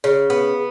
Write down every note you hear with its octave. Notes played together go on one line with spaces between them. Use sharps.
C#3
B3